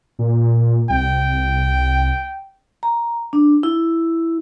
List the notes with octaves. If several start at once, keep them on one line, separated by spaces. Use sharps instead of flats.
A#2
C2 G5
A#5
D4
E4